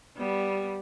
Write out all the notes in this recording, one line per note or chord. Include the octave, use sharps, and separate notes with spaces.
G3 B3